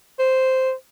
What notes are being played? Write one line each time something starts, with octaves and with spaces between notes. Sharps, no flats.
C5